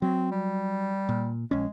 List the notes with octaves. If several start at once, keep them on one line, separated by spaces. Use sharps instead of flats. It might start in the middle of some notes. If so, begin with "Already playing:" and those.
F#3 C4
G3
A#2
A#1 G#3 C#4